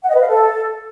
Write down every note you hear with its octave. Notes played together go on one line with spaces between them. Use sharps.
F#5
D#5
B4
F5
A4